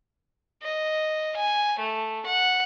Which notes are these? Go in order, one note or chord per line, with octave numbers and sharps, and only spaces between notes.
D#5
G#5
A3
F#5